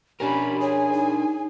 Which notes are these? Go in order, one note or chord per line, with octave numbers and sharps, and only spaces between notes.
C#4 D4 G4 A#4 B5
G#4 C#5 G#5
D#4